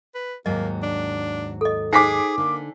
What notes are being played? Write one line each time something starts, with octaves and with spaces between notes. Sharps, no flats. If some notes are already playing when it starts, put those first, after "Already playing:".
B4
D#2 G#2 F#3 A#3 D#5
D4
A4 D#5
D#4 G#4 C5 G#5 D6 B6 C7
D3 A#3